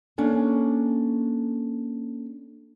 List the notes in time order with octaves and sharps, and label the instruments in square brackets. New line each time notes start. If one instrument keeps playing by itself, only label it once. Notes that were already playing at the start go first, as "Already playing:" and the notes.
[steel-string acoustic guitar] A#3 C#4 D4 A4